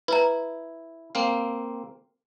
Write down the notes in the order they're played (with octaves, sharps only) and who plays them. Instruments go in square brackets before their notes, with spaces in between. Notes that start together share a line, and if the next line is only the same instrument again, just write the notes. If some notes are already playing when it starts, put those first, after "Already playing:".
[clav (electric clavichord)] E4 [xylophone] B4 A#5
[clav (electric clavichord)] A#3 C4 F5